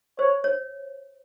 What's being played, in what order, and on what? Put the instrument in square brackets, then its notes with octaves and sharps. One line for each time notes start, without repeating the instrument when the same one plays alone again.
[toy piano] C5 [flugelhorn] C#5
[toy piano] C#5